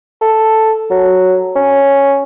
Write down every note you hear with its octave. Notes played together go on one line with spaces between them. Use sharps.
A4
F#3
C#4